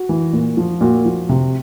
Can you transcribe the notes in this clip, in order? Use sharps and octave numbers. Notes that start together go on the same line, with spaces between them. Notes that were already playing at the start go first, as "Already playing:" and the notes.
Already playing: F#4
E3
A#2
F3
A#2 F#4
F3
C3